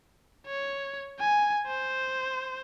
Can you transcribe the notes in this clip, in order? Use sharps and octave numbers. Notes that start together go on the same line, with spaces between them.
C#5
G#5
C5